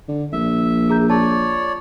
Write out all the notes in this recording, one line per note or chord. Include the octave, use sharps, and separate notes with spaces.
D3
A#1 E5
G#4 A#5 G6
F4 C#5 D5 A5